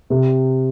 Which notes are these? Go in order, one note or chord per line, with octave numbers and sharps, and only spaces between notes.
C3